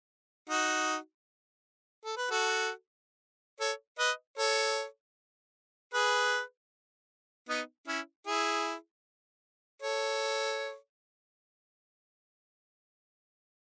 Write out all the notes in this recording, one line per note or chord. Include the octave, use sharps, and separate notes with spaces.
D#4 F#4
A4
B4
F#4 A4
A4 C#5
B4 D#5
A4 C#5
G#4 B4
B3 D#4
C#4 E4
E4 G#4
A4 C#5